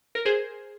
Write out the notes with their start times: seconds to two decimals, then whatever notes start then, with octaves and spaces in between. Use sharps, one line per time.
0.15 A#4
0.25 G#4 C5